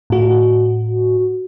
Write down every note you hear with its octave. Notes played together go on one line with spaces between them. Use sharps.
A2 F#4